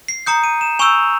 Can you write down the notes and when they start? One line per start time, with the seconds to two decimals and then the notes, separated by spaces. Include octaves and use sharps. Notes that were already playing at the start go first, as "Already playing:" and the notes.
0.08 C7
0.26 A#5 D#6 G6 C#7
0.44 D#7
0.61 E7
0.79 G#5 C#6 E6 G6 F7